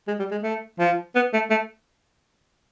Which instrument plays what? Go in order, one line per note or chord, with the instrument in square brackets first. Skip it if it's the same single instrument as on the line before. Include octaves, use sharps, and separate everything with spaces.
[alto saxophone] G#3
G3
G#3
A3
F3
B3
A3
A3